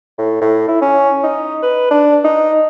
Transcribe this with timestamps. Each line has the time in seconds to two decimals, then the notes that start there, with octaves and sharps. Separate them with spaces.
0.18 A2
0.41 A2
0.69 E4
0.82 C#4
1.23 D#4
1.63 B4
1.91 D4
2.25 D#4